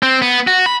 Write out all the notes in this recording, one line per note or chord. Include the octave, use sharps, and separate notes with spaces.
C4
B3
F#4
B5